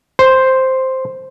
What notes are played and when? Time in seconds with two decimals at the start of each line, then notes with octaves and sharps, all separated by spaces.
0.19 C5